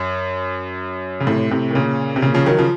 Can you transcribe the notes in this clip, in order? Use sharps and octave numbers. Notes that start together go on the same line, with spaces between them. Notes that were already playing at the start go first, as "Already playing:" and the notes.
Already playing: F#2
C#3
A2 C3
A2 C3
D#3
A#2 C#3
C3
A#2 C#3
C#3 F3
D#3 F#3
C#3 F3